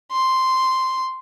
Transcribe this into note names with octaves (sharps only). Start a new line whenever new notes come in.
C6